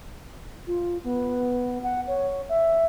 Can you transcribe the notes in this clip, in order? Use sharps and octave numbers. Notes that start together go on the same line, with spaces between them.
F4
B3
F#5
C#5
E5